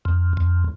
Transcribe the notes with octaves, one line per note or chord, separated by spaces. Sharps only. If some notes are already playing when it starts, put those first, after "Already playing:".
F2
F2